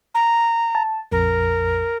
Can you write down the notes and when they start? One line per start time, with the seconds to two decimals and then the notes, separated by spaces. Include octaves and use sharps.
0.15 A#5
0.75 A5
1.12 A#1 F2 A#4